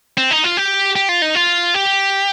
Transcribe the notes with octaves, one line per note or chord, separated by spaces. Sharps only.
C4
D#4
F4
G4
G4
F4
D#4
F4
G4